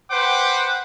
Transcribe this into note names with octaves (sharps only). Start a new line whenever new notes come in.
B4 C5 F#5 G5 D6